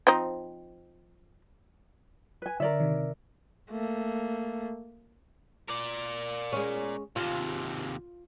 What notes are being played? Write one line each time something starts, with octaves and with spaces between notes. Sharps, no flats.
F3 C4 D#4
B4 G#5
D3 A#4 C#5 D5 E5
C3 D#3
A3 A#3
A#4 D5
G#3 C#4
D#2 C3 F4